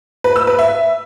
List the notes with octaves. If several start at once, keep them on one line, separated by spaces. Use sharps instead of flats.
B4
E6
B4
E5